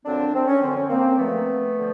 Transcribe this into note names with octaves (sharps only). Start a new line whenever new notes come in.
F#2 D3 F3 C4 D4
C4
C#4
F#2 D3 F3 C4
C#4
A#3 C4
F#2 D3 F3 A3 B3
D3 F3